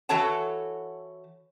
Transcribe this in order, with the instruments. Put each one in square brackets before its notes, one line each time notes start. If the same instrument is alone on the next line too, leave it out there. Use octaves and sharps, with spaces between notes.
[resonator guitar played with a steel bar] E3 F#4 A4 C#5 F#5 A5